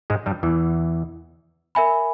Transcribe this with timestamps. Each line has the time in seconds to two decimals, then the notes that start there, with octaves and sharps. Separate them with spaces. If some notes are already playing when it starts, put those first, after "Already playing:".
0.10 G#2 G#3
0.26 G2 G3
0.43 E2 E3
1.75 A#4 E5 G#5 B5